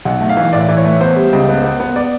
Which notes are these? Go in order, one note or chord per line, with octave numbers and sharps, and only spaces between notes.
B1 F#5
A3
F5
E3
A2 D5
E3
C#5
A3
B3 C5
G3
C#2
B3
B3
B3
D5